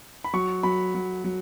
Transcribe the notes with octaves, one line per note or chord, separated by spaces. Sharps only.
B5
F#3 C#6
F#3 B5
F#3
F#3